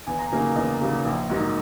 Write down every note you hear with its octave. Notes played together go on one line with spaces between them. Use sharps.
E2 G#5
A#5
C#3 F#3 A#3 D#4 G#5
E2 D#5
C#3 F#3 A#3 D#4
A#1
G#2 F#3 A#3 D#4